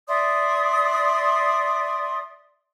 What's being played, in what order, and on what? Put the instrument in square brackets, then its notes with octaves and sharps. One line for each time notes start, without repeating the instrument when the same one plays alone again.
[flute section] D5 E5 C6 D#6